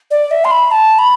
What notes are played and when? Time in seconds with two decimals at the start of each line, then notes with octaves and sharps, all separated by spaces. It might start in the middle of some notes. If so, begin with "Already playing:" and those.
0.11 D5
0.31 E5
0.45 C6
0.51 B5
0.71 A5
0.99 B5